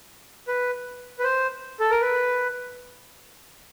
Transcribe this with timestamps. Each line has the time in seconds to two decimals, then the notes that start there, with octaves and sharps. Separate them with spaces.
0.48 B4
1.19 B4
1.24 C5
1.80 A4
1.91 A#4
2.01 B4